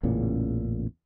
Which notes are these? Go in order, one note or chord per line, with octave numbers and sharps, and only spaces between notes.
A1 E2 A#2 C#3